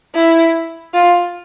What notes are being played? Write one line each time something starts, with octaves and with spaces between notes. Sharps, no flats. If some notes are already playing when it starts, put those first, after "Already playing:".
E4
F4